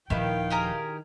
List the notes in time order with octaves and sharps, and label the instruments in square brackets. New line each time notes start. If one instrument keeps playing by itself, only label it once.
[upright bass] D#1 F3 [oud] D#3 E4 B4 [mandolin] G4 [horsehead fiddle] F5 G5
[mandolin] G4 G#4 A#4